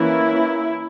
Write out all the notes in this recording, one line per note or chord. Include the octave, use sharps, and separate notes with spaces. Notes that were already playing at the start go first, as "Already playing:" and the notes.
Already playing: E3 A#3 C#4 E4